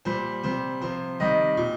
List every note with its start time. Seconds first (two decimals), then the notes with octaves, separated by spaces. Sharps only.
0.05 A#2 G3 C5
0.43 C3 G3 C5
0.81 C3 F3 C5
1.20 C3 D#3 G3 D#5
1.57 A#2